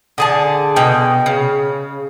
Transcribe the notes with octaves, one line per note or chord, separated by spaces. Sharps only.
D3 G#4 A5
B2 G5
C#3